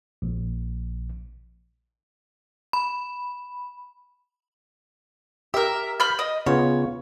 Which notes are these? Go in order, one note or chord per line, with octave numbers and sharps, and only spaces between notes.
A#1
B5
G4 A#4 E5
B5 F6 G6
D#5
C#3 B3 F4 C#5